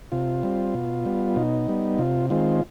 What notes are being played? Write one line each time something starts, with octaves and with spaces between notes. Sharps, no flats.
C3 F4
G3 C4
B2
G3 B3
B2 D#4
G3 B3
C3 F4
D#3 G#3 C4 F4